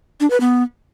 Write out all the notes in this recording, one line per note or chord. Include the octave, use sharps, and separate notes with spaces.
D4
B4
B3